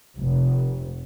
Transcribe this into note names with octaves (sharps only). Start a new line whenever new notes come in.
F1